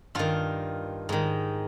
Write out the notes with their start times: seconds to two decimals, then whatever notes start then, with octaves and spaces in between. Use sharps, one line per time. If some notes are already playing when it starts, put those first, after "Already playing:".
0.15 G2 D#3 F4
1.09 G#2 D#3